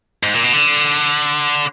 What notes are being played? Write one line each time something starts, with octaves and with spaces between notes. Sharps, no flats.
G#2
A#2
B2
D3